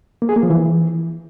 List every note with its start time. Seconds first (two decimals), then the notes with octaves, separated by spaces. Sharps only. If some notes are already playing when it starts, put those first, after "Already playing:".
0.22 A#3
0.29 G#4
0.36 A#3
0.43 F3
0.50 E3